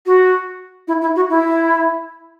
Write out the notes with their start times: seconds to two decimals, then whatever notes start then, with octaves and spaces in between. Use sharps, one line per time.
0.06 F#4
0.88 E4
1.01 E4
1.16 F#4
1.30 E4